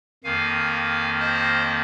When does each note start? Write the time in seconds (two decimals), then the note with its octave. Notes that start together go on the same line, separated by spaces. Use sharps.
0.24 F2 D#3 A#3 F5 G#5
1.20 C5 D#5